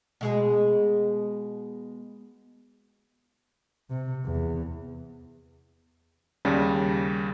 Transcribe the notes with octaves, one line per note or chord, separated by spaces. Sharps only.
B2 G#3 G#4
C3
E2
D#2 C#3 G3